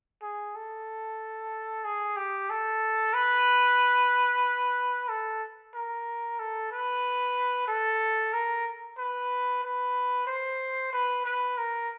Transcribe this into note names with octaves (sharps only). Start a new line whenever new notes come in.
G#4
A4
G#4
G4
A4
B4
A4
A#4
A4
B4
A4
A#4
B4
B4
C5
B4
B4
A#4